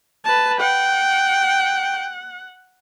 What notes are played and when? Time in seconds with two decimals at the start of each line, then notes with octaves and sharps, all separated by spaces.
0.24 B4 A5
0.61 F#5 G5